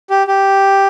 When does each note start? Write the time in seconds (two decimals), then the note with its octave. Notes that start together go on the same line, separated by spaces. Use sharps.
0.10 G4
0.27 G4